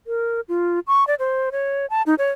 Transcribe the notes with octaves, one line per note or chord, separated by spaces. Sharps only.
A#4
F4
C#6
D5
C5
C#5
A5
D#4
C#5